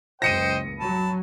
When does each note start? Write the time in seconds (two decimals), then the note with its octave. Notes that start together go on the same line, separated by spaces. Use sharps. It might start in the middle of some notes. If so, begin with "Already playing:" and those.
0.22 F#1 C#2 C5 D#5 G5 A#6 C#7 D#7
0.80 F#3 A5 B5